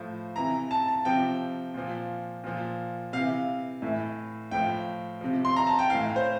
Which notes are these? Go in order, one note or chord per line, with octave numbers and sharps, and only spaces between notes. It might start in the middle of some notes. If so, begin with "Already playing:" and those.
Already playing: A2 F3
C3 E3 A#5
A5
A5
C3 F3 G5
A#2 F3
A#2 F3
C3 E3 F5
A2 E3
A2 F3 G5
C3 F3
C6
A#5
A5
G5
A2 E3 F5
C5